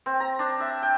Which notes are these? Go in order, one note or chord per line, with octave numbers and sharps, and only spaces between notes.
C4
A#5
D4
E5
G5